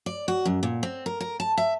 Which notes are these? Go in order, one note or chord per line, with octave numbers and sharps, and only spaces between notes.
D5
F#4
F#2
A#2
C4
A#4
A#4
A5
E5